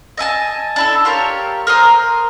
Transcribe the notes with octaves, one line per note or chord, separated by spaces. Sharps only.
D#5 E5 G#5 A5
D4 E4 A4
F4 G4 A#4 C#5
A#4 C5 A#5 D#6